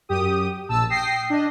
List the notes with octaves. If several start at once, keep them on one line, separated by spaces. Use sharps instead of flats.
F#2 G4 D#6
A#1 A5 E6
G5 D#6 A#6 C7
D4 D#5